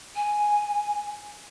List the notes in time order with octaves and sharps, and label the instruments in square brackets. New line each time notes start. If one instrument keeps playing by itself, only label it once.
[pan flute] G#5